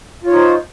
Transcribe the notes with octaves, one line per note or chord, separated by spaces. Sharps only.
D#4 F4 C5 C#5